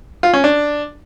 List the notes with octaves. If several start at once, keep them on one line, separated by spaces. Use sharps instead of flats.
F4
C#4
D4